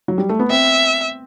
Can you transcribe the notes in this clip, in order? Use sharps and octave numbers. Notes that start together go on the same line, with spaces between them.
F#3
G3
A3
B3
C4 E5